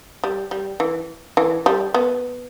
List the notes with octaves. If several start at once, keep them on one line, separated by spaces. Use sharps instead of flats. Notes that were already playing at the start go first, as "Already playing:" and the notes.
G3
G3
E3
E3
G3
B3